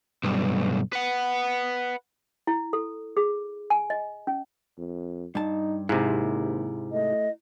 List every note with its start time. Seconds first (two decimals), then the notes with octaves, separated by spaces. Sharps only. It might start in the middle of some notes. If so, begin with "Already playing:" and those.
0.23 B1 G2
0.93 B4 F#5
2.47 E4
2.73 A4
3.17 G#4
3.70 G#5
3.90 D#5
4.27 C#4
4.78 F2
5.35 G2 D#4 A5
5.89 D#2 G#2 C3 E4
6.92 A3 D#5